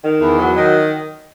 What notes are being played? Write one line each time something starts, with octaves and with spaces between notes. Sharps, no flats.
D#3
E2
F#3
D#3